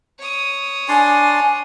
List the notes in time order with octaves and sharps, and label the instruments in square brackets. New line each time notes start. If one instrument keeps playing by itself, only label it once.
[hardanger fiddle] C#5 D#6
[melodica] D4 D5 C6 [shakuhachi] G#5